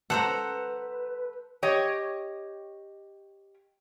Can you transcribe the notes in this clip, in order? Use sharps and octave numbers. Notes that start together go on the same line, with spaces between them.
A4 B4 C5 F#5 A#5
G4 C#5 D#5